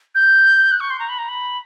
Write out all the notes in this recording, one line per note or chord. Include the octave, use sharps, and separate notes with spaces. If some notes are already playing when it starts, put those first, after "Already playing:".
G6
F#6
C#6
C6
A#5
B5
A#5
B5